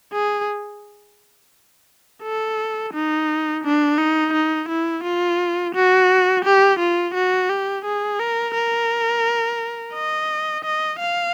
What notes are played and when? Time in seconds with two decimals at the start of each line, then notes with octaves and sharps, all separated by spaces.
0.13 G#4
2.23 A4
2.93 D#4
3.64 D4
3.98 D#4
4.33 D#4
4.68 E4
5.04 F4
5.75 F#4
6.45 G4
6.79 F4
7.14 F#4
7.49 G4
7.85 G#4
8.19 A#4
8.55 A#4
9.94 D#5
10.65 D#5
11.00 F5